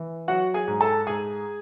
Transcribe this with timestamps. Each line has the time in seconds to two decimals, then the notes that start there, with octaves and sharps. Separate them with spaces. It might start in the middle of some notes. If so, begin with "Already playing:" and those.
Already playing: E3
0.28 F#3 F#4 F#5
0.54 G#4 G#5
0.68 G#2
0.81 A4 A5
1.07 G#2 G#4 G#5